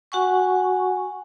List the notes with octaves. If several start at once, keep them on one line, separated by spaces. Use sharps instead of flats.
F#4 F#5 G#5 C#6